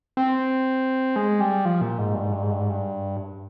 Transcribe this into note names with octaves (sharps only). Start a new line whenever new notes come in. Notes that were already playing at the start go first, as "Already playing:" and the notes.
C4
G#3
G3
F3
A#2
G#2
G2
G#2
G2
G#2
G2
G#2
G2